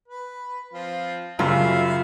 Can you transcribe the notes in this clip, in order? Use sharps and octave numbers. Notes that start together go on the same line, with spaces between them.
B4
F3 C4 F4
F#2 C#3 G3 F4 E5 F5 B5